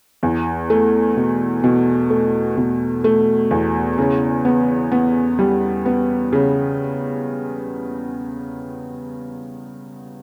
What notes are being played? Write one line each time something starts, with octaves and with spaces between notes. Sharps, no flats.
E2
A3
B2
B2
A3
B2
A3
E2
C#3
B3
B3
G3
B3
C#3